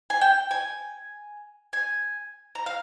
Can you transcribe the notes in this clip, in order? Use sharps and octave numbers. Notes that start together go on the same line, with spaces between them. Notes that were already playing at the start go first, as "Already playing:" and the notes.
G#5
G5
G#5
G#5
A#5
F5